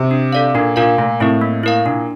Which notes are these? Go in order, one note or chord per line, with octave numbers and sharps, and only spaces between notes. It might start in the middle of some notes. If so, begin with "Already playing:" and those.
Already playing: C3
D4
A4 D5 F5
A#2 D4
A#2 F4 A#4 F5
A#2 A3
A2 C4 E4 A#4
A#3
E4 A#4 F5
A#2 D4